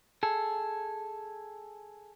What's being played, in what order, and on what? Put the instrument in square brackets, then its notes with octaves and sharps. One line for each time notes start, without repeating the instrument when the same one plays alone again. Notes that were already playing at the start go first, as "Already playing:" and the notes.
[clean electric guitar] G#4 A4